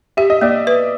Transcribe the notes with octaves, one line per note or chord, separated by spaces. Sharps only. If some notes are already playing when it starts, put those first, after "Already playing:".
G4 E5
D#5
A#3 D5 E5
B4